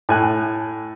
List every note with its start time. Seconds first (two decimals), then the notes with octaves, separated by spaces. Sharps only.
0.09 A2 G#5 F#6